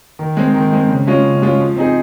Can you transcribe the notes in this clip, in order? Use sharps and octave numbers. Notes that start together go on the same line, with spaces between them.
D#3
G#3 C4
D#3
G#3 C4
C#3
G#3 C#4 F4
C#3
G#3 C#4 F4
F3
C4 D#4 G#4